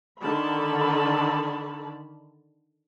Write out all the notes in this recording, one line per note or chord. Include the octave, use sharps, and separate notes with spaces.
D3 D#3 A5 B5